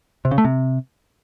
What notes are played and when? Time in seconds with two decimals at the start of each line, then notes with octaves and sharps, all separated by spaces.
0.25 C3
0.31 C#3
0.38 A3
0.45 C3